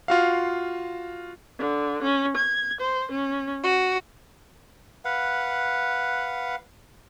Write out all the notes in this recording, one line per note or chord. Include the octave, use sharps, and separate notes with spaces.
F4 F#4 F5
D3
C#4
G#6
C5
C#4
F#4
B4 F5 F#5